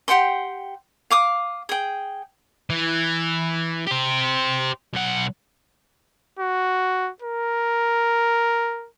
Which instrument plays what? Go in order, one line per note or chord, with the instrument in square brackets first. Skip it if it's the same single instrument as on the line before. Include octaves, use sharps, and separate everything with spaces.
[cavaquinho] G4 F#5 G5 C6
F5 D6 D#6
G#4 G5
[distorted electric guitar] E3
G4 C5
B1 F#5
[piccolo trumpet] F#4
A#4